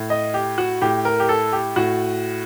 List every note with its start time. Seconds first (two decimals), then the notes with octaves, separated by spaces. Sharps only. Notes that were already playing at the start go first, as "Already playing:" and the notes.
Already playing: A2
0.10 D#5
0.34 G4
0.58 F#4
0.82 A2 G4
1.05 A#4
1.20 G4
1.29 A4
1.53 G4
1.76 A2 F#4